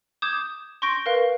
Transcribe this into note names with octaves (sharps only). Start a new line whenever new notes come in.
D6 D#6 G6 G#6 E7
C6 C#6 G6 A#6 D7
A#4 B4 F5